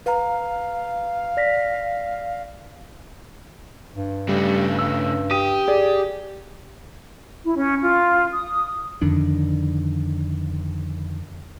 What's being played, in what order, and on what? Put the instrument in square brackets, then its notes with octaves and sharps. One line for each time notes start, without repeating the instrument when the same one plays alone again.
[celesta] B4 A#5 [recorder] F5
[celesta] D5 A#6 B6
[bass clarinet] G2
[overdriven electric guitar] C#3 A3 [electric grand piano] G3
[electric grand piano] E6
[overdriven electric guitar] G4 [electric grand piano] D#6 D#7
[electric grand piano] G#4 D5
[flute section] E4
C#4
F4
D#6
[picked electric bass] F2 D3 D#3 D4